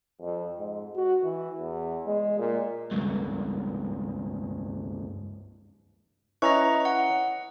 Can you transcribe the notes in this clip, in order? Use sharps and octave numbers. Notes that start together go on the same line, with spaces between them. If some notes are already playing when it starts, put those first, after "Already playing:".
F2
G#2
F#4
E3
E2
G#3
A#2
C#2 G2
C#4 E4 B4 D#5 A#5 C#6
F#5